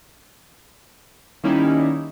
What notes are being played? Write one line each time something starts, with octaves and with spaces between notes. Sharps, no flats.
D#3 G3 A#3 C#4 D#4 E4